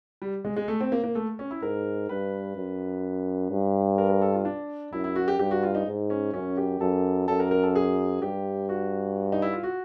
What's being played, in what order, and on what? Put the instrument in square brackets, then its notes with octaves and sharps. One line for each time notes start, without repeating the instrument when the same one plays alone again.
[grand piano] G3
G#3
G#3
A3
C4
A#3
A#3
A3
C#4
E4
[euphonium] G#2 [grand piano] A#4
[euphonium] G2 [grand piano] B4
[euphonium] F#2
G2
[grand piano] A#4
A#4
A4
F4
D4
[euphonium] F#2 [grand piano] E4
[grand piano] E4
F#4
G4
[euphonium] G2 [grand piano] G4
[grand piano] F#4
F4
D#4
[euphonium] G#2
[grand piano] C#4
[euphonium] F#2 [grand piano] C#4
[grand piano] G4
[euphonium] F#2 [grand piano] A4
[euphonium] F#2 [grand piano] A4
[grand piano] A#4
A#4
A4
G#4
[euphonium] G2 [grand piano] G4
[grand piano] F#4
D#4
E4
F4
F#4